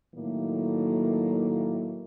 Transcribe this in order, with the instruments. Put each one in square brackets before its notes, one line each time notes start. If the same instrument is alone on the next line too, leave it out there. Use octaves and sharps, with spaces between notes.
[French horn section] A2 D#3 F#3 A3 A#3